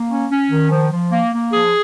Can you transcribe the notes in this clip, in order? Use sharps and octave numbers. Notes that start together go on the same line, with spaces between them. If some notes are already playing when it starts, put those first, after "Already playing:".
Already playing: A#3
C#4
C#4
D#3
F3
F3
A#3
A#3
F3 G#4